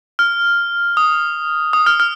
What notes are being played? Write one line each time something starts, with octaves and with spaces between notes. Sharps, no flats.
F6
D#6
D#6
F6
F6